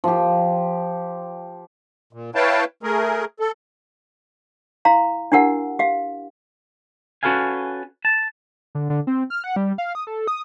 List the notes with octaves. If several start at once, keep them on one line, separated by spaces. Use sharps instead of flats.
F3 G4
A#2
E4 B4 C#5 F5 G5 A5
A3 G#4 A#4
A4
E4 F5 A#5 C6
D4 E4 G4 A#4 F#5
G4 F5
C#4 F#4 A4 B4 F5 G#5
A5
D3
D3
C4
F6
F#5
G3
F5
D#6
A4
D#6